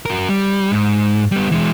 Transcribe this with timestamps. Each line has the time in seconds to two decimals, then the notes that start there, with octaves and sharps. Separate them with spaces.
0.05 F#4 A#4
0.29 G3
0.72 G#2
1.32 G3 B3
1.52 E3 G#3